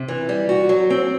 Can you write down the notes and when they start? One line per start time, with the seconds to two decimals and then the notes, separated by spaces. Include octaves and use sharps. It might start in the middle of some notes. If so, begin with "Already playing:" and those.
Already playing: C3
0.08 E3
0.29 G3
0.49 F#4
0.69 F#3
0.90 C4